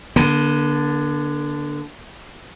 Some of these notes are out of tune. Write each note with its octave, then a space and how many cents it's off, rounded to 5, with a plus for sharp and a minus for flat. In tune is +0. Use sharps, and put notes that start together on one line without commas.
D3 +0 A#3 +45